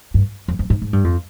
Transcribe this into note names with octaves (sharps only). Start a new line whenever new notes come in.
G2
F2
F2
G#2
G#2
G2
F2